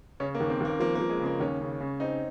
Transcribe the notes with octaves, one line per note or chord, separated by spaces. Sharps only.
C#3 C#4
A#3
D#2
C4
D#2 A#3
F3 A#3
A#3
F3
G#3
C#3
A#3
D#2 C#4
C#3
C#3
C4 D#4